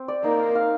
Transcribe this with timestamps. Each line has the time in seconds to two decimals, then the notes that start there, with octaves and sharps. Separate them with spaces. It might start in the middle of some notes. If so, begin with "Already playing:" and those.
Already playing: C4
0.08 D5
0.24 A#3 D#4
0.40 A#4
0.55 F5